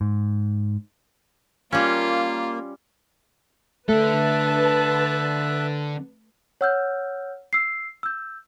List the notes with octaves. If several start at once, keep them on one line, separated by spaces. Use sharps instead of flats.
G#2
G3 A#3 C#4 F4
D3 A3 A4 B4 E5 A5 F#6
C#5 F#5 E6 F6 G6
E6 C7
E6 G6